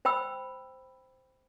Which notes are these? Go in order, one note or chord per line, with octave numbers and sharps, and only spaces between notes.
C5 G5 B5 E6